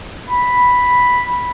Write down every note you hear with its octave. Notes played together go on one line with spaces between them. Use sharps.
B5